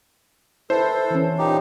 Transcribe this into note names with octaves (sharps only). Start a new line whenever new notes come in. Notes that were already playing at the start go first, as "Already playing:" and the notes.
E4 A4 B4 C5
E3 C#4
A#2 D#4 G4